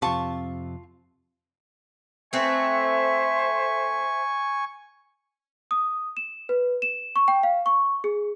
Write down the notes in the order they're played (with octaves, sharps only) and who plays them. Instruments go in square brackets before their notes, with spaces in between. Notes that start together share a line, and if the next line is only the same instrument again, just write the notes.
[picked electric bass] F2 C3 [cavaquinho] F4 A5 C#6
[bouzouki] A3 C4 B4 [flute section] C5 E5 [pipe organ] G#5 C#6
[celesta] D#6
E7
B4
E7
C#6
G5
F5
C#6
G#4